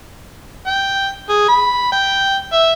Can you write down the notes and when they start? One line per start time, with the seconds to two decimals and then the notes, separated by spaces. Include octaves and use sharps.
0.67 G5
1.29 G#4
1.48 B5
1.92 G5
2.53 E5